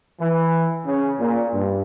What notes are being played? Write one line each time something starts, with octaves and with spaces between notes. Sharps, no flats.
E3
C#3
A#2
G2